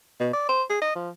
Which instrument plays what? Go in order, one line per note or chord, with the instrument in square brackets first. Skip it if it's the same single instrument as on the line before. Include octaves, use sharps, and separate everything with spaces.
[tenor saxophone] B2
D5
C5
G#4
D#5
F3